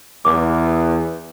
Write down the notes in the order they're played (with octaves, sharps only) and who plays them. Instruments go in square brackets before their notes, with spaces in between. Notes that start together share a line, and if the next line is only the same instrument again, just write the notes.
[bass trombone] E2 [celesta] D6